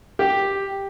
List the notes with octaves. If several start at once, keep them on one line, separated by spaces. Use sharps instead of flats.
G4